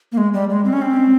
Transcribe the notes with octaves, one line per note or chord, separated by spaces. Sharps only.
A#3
G#3
G3
G#3
C4
C#4
C4